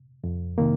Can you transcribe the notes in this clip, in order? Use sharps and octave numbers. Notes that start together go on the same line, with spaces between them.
F2
C3 D#3 A#3